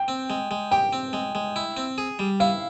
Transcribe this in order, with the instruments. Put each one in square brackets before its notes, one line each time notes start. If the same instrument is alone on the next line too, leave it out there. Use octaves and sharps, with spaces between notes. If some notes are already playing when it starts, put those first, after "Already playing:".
Already playing: [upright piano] G5
[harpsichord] C4
G#3
G#3
[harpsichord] G4 [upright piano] G5
[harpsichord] C4
G#3
G#3
E4
C4
G#4
G3
[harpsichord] E4 [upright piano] F5